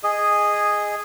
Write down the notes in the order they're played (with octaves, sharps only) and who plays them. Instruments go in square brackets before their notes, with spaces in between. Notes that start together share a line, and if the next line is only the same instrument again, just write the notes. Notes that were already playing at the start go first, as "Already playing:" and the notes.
[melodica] G#4 D#5